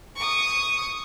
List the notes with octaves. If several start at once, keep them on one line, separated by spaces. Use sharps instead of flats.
C#6 D#6